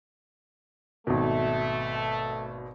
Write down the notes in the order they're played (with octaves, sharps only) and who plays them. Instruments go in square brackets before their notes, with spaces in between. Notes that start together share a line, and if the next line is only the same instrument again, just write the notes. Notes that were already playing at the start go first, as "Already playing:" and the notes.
[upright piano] G#1 B2 [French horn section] A3